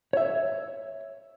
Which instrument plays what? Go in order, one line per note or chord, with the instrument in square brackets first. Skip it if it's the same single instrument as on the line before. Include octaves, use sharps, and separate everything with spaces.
[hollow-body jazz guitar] C#5 E5